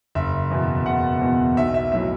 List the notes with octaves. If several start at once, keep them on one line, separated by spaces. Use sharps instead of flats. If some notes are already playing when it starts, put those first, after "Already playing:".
F#1 E5
E2 B2
F#1 F#5
E2 B2
B1 E5
E5
A2 F#3 E5